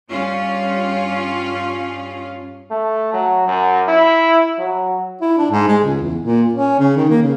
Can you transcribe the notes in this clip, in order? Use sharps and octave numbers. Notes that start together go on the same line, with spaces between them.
G2 G3 C#4 F4
A3
F#3
F#2
E4
F#3
E4
D4
G#2
G#3
C#2
E2
A#2
C#4
C#3
D#3
A#3
C#3